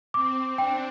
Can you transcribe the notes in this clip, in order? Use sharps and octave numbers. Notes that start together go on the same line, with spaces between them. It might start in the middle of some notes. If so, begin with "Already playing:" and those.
C4 D6
D4 G5